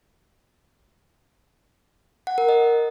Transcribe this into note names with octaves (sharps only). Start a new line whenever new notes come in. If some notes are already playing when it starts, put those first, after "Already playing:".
F#5
A#4
D#5